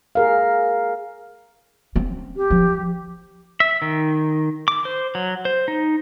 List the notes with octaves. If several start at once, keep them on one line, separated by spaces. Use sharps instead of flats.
G#4 A#4 F5
C4 C#4
G4
F3
E5
D#3
D6
C5
F#3
C5
D#4